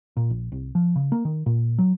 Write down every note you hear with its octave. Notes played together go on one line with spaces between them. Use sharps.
A#2
A#1
C2
F3
C#3
A#3
D#3
A#2
F#3